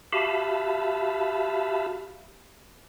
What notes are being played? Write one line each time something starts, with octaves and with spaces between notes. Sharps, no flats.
F#4 G4 E5 F5 A5 B5